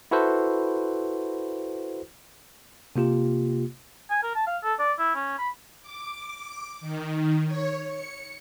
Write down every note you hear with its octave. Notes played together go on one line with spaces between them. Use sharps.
E4 F#4 A4 B4 C5
C3 A#3 F4 G4
G#5
A#4
A5
F5
A4
D5
E4
C#4
B5
D6
D#3
C#5
C#7